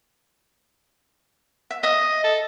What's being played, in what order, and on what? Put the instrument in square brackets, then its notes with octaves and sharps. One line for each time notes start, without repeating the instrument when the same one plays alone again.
[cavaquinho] E5
[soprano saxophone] D#5 [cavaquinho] E5 D#6
[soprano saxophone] A4